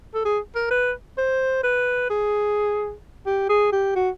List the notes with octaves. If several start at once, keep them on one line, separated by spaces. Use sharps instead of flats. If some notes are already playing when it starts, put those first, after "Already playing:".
A4
G#4
A#4
B4
C5
B4
G#4
G4
G#4
G4
F#4